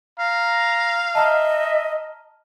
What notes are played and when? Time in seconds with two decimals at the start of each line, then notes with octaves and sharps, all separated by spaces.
0.19 F5 A#5
1.15 D#5 E5 A5 A#5 F6